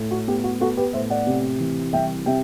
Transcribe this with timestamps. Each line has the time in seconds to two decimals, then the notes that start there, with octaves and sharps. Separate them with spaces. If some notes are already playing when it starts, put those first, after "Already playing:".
Already playing: A2
0.11 F#4
0.27 B3 G4
0.44 F#4
0.60 B3 F#4 A4
0.77 G4 B4
0.93 A2 C5 E5
1.10 D5 F#5
1.27 C3
1.60 E3
1.93 C2 E5 G5
2.26 C3 E5 G5